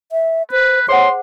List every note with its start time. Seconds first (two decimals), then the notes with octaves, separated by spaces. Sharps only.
0.12 E5
0.51 B4 C5
0.88 G#4 C5 C#5 F#5 C6